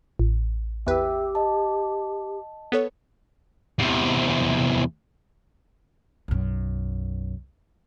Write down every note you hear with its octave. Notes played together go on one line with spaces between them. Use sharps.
A1
E2 G4 B4 E5 G5 E6
D#5 A5
B3 A4 B4 C#5
E2 C3
B1 F#2